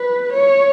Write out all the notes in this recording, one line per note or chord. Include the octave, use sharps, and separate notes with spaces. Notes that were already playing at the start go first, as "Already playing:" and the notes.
Already playing: B4
C#5